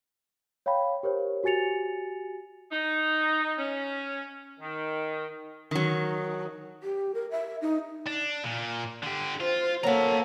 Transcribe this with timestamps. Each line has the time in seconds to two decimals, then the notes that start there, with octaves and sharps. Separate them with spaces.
0.66 C#5 F5 G5 B5
1.03 G4 A#4 C5 C#5
1.44 F#4 G4 G#5 A6 C#7 F7
2.72 D#4
3.58 C#4
4.60 D#3
5.71 D#3 F#3
6.83 G4
7.14 A#4
7.31 E5
7.62 D#4
8.07 D4
8.44 A#2
9.03 D3 G4
9.40 F4 C5
9.84 F#3 A#3 F#4 A4 E5 A#5